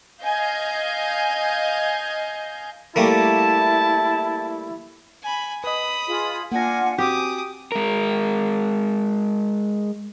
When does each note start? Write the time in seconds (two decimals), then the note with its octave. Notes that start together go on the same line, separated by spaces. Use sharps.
0.23 D#5 F5 G#5 G6
2.96 G3 A3 A#3 E4 A5
5.23 G#5 B5
5.64 B4 D#5 B5 D#6
6.07 F4 G#4
6.52 A#3 D4 F4 F#5 G#5 A#6
6.98 C4 F#4 G4 G#5 D6 D#6
7.72 G#3 A#4